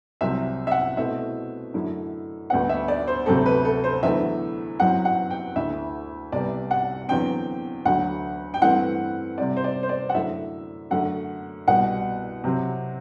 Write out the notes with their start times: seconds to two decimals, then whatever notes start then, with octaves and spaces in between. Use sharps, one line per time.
0.21 C2 C3 F#3 C4 E5
0.67 E5
0.71 F#5
0.97 B2 A3 C4 E4 E5
1.74 F#2 D3 A3 E4
2.50 D2 D3 G3 B3 F#5
2.69 E5
2.88 D5
3.08 C5
3.26 D2 C3 F#3 C4 A4
3.46 B4
3.65 A4
3.84 C5
4.03 E2 D3 F#3 A3 E4 E5
4.79 F#2 F#3 C4 E4 F#5
5.05 F#5
5.30 G5
5.56 D2 D3 A3 E4 E5
6.32 C2 C3 G3 B3 D5
6.71 F#5
7.08 E2 D3 F#3 C4 G5
7.85 D2 D3 F#3 F#5
8.54 G5
8.62 G2 E3 A3 C4 E4 F#5
9.38 C3 G3 C4 D5
9.57 C5
9.64 D5
9.83 C5
9.89 D5
10.09 F#5
10.14 F#2 D3 A3 E4 E5
10.91 F#2 D3 A3 F#5
11.68 C2 B2 G3 F#5
12.44 C3 F#3 C4